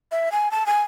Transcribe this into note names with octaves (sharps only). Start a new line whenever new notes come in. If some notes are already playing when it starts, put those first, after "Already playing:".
E5
G#5
A5
G#5